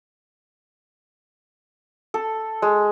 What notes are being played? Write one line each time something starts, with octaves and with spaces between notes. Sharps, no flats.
A4
G#3